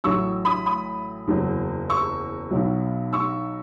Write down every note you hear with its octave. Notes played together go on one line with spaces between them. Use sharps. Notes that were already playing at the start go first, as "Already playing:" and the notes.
A1 A2 F#3 C#6 E6
B5 D#6
B5 D#6
F#1 E2 D#3 F#3
C#6 E6
B1 B2 F#3
C#6 E6